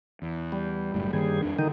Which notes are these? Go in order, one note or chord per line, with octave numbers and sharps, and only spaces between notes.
E2
G3
F#1 F#2 A2
G2 D#3 G3 A#3 G#4
F2 D4
D3 D#3 D#4